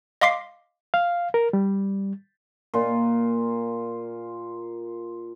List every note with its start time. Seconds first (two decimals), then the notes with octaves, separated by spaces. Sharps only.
0.21 D#5 F5 C6 D6 B6 C7
0.94 F5
1.34 A#4
1.53 G3
2.74 A#2 F4